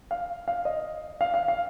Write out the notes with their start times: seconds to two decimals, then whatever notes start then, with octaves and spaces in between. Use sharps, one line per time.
0.11 F5
0.48 F5
0.65 D#5
1.21 F5
1.34 F5
1.48 F5